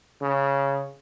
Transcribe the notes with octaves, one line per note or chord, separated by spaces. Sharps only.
C#3